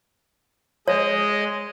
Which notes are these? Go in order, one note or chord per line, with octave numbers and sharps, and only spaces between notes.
G#3 C#5 D#5